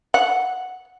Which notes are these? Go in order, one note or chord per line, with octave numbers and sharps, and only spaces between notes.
F#5